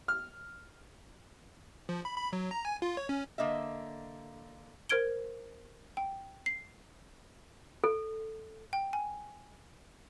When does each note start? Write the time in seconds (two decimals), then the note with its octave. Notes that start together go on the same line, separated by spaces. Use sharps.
0.08 F6
1.89 F3
2.05 B5
2.17 B5
2.33 F#3
2.51 A#5
2.65 G#5
2.82 F4
2.97 C#5
3.09 C#4
3.38 D3 A#3 D#5 E5
4.89 A#4 C5 F6 G#6 D7 G7
5.97 G5
6.46 C7
7.84 A4
8.73 G5
8.93 G#5